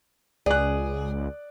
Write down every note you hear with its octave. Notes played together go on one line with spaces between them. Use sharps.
C#2 G#4 D5 F#6